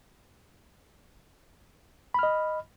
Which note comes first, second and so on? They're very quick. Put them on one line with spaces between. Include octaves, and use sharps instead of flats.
B5 F6 D#5